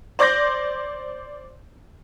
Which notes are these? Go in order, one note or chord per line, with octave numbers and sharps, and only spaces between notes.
C5 D5 C6 D6 G6 A#6